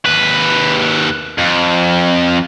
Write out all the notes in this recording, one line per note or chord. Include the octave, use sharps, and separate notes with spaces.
D#2 B4
F2